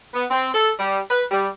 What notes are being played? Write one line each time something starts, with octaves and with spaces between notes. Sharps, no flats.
B3
C4
A4
G3
B4
G3